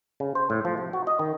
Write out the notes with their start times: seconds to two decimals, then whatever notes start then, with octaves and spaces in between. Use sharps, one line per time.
0.20 C#3
0.35 C5
0.50 A2
0.65 F3
0.78 C3
0.93 F#4
1.07 D#5
1.19 D#3